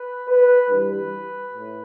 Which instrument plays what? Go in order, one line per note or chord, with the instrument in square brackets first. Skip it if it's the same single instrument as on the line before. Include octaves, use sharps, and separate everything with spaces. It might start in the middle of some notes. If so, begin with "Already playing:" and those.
Already playing: [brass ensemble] B4
B4
G2 E3 G3 B4
A2